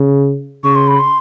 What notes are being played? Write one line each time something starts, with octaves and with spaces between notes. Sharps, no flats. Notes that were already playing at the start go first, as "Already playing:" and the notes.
Already playing: C#3
C#3 C#6
C6
B5
C6